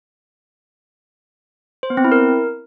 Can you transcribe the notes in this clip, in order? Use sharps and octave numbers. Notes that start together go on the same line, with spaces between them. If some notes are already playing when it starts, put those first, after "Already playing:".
C5
B3
C4
E4
A#4